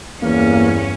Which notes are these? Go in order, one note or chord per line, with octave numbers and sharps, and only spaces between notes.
E2 G2 A#3 C#4